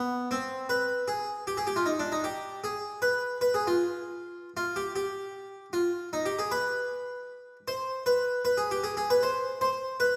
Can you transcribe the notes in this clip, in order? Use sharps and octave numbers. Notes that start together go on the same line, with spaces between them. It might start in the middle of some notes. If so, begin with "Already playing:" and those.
Already playing: B3
C4
B4
G#4
G4
G#4
G4
F4
D#4
D4
D#4
G4
G#4
B4
B4
G#4
F4
F4
G4
G4
F4
D#4
G4
G#4
B4
C5
B4
B4
G#4
G4
G#4
G#4
B4
C5
C5
B4